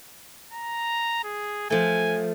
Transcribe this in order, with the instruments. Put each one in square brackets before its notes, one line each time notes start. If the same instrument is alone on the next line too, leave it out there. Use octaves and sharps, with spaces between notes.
[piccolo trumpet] A#5
G#4
[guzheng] F3 A3 [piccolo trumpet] G#5